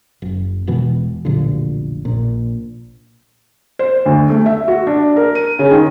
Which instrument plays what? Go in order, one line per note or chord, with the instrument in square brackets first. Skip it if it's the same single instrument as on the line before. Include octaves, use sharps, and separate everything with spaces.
[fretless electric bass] F#1
E1 B2 E3
F1 B1 A#2 D3
A#1 A#2
[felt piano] C5
D2
A3
E5
F#4
D4
A#4
D#7
C#3
D#3